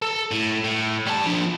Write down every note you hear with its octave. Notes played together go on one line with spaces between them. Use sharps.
A4
A2
A2
G3 A5
F3 D4